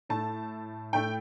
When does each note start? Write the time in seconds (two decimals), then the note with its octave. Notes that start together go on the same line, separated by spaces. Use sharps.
0.09 A2 A3 A5
0.93 A2 A3 G5